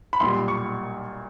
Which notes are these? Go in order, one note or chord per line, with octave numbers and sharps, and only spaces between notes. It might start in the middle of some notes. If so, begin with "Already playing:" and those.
B5
B1 A#2 G3 C6
C#6